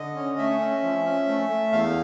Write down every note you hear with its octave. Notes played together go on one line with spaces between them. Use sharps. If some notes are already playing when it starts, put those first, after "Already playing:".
Already playing: D3 D#5
C#4
A3 E5
C#4
F3
C#4
A3
A3
E2 F5